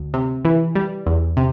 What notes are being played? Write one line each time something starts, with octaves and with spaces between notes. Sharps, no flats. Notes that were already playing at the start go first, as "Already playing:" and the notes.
Already playing: D2
C3
E3
G3
E2
C3